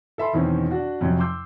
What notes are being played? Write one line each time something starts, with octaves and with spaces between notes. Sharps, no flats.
A4 E5 B5 C6
E2 B2 D#3 C4 C#4
D4 F#4
F2 C3 F3 F#3 C#4
C6 D6 E6 G6